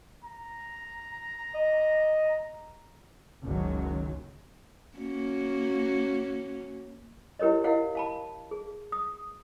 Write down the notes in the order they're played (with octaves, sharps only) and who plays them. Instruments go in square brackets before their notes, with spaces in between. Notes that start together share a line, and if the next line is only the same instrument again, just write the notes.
[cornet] A#5
[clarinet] D#5
[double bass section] F#1 C#2 D#3 F#3
[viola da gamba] A#3 C#4 F#4
[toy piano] E4 G4 A#4 C#5 D#5
E4 A#4 D#5 F5 F#5
F5 A5 B5
G#4
D#6